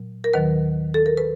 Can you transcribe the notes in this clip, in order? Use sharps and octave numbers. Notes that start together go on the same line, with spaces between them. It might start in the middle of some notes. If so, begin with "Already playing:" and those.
Already playing: A#2 F#3
A#4
D#2 D#3 F#3 B4
A4
A#4
B4